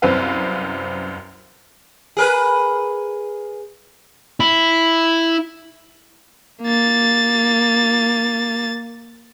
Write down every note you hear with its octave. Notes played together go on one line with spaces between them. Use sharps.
C2 F#2 C4 B4 F5
G#4 A#4 B4
E4
A#3 A6